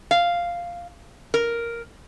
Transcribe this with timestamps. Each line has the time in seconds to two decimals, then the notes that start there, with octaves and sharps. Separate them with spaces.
0.11 F5
1.34 A#4